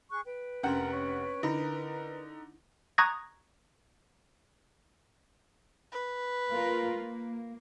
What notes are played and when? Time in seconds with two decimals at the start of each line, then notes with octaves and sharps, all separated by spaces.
0.10 G#4 C#6 F#6
0.25 B4 G5
0.63 F1 C#4 D4 A#4 F#5 C6
0.93 C#5
1.43 D3 D#4 E4 A#4 B5
2.98 A#5 C#6 D#6 F#6 G#6 A#6
5.91 B4
6.51 A#3 F4 A#4
6.96 A#3